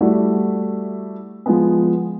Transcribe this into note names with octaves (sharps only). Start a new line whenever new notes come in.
G3 A3 E4 F#4
F3 G#3 B3